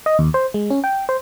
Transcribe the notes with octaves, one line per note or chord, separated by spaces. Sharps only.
D#5
D#2
C5
G#3
C#4
G5
C5